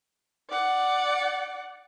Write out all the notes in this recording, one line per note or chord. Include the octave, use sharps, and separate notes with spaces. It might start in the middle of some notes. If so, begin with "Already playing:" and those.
D5 F#5